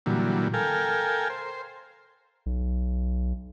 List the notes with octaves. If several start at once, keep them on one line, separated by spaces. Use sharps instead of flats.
A#2 D3 E3 F#3 G3
A4 A#4 F5 G5 G#5
C5
B1